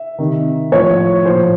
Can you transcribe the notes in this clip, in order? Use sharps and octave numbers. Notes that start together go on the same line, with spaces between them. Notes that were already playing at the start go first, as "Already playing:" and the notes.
Already playing: E5
C3 D#3
A2 F3 C#5
A#2 F3 C5